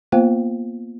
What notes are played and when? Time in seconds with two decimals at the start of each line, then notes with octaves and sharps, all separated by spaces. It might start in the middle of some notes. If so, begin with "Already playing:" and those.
0.12 A#3 B3 F4 C5 F5 G5